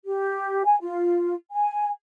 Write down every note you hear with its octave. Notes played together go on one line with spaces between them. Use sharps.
G4
G#5
F4
G#5